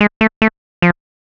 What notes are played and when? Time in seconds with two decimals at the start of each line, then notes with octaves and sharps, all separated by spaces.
0.01 G#3
0.21 A3
0.42 A3
0.82 F3